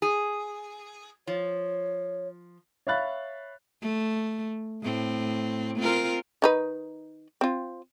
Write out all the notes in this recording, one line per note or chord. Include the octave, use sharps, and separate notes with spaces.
G#4
F3 C#5
C#5 E5 F5 B5 F#6 A6
A3
A2 C4
C4 F4 A#4
D#3 D#4 B4
C4 F4